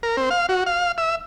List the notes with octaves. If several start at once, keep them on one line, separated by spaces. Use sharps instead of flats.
A#4
C4
F5
F#4
F5
E5